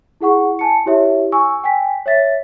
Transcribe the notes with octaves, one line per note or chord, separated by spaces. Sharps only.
E4 G#4 F#5 C#6
G#5 A5 C#7
E4 G4 C#5 E5
G#5 C#6 E6
G5 G#5 B6
C#5 E5 A6 B6